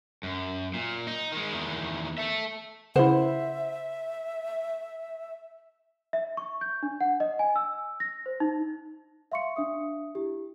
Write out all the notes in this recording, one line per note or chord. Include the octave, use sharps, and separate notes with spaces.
F#2
A#2
D#4
D#3 G#3
E2 D#3
A4 E5
C#3 E4 C5 E5 F#5
E5
C#6
G6
D4
F#5
D#5
G#5
E6
A#6
C5
D#4
E5 F5 C6 C#6 C#7
D4 E5 D#6
E4 G4